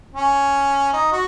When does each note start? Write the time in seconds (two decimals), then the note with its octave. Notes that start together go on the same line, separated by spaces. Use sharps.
0.15 C#4
0.93 D#4
1.12 F#4